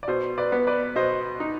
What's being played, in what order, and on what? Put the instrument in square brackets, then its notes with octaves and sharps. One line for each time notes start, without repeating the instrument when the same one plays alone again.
[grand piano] D5
[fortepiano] B2 [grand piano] C5
[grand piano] B4 D5
[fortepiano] B3
[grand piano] B4 D5
[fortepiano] B2 [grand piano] C5 D#5
[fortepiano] D#4